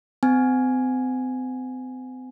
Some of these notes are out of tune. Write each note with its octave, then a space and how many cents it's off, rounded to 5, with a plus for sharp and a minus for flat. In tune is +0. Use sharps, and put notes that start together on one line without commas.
C4 -40 G#5 +0